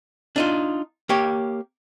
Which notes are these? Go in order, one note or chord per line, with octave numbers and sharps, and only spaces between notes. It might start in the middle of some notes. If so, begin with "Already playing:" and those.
D4 D#4 F4
A#3 G4 C#5